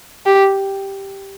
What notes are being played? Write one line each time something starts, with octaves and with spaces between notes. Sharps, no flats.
G4